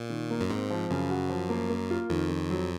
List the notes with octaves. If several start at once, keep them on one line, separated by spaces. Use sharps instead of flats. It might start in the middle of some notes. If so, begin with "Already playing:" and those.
Already playing: A#2
D#3
A#3
F#2
G#2 C4
F3
F#2 C#3
F#4
F3
A#3
A#3
F4
F2 D#3
D#3
F#3